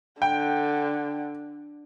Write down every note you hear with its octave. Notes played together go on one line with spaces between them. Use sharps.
D3 G5